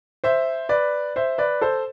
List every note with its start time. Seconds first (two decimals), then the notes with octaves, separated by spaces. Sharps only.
0.24 C5 E5
0.69 B4 D5
1.16 C5 E5
1.38 B4 D5
1.61 A4 C5